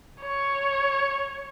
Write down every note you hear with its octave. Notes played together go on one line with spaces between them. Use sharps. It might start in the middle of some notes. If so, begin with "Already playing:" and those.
C#5